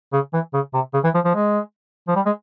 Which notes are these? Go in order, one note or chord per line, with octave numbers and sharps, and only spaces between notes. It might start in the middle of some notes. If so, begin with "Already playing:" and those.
C#3
E3
C#3
C3
C#3
E3
F3
F3
G#3
F3
G3
G#3